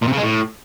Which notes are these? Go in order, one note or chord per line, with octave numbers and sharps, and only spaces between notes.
A#2
C3
C#3
G#3
A2